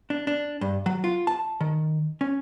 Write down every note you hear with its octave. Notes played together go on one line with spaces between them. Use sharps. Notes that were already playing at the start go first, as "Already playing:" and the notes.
D4
D4
G2
F#3
F4
A5
D#3
C#4